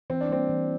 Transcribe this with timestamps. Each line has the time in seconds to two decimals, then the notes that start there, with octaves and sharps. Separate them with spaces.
0.10 E3 C4
0.21 D4
0.29 G3 A#3 C4
0.49 E3